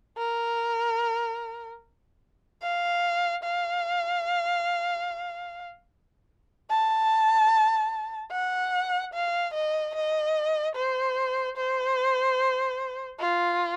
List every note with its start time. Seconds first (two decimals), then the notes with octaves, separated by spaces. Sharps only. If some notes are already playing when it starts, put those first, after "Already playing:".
0.18 A#4
2.62 F5
3.43 F5
6.70 A5
8.32 F#5
9.14 F5
9.54 D#5
9.95 D#5
10.76 C5
11.57 C5
13.20 F4